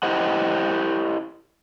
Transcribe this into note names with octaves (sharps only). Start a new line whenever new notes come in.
E4 G4 C5 D#5 F#5